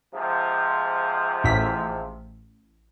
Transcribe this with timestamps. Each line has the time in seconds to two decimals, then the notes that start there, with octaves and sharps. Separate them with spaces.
0.14 G#2 C3 F3
1.44 A1 B6